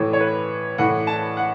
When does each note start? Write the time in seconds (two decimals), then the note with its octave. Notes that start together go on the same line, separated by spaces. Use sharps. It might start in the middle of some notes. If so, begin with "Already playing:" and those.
Already playing: A2 E3 C#5
0.13 C#5
0.20 B4
0.78 A2 E3 F#5
1.07 A5
1.37 F#5